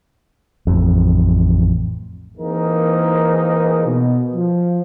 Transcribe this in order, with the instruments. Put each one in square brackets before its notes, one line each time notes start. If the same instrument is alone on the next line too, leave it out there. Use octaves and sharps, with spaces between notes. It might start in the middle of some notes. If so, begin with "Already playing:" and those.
[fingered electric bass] A1 F2
[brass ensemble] E3 A#3 C4 D#4 G#4 A#4
B2
F3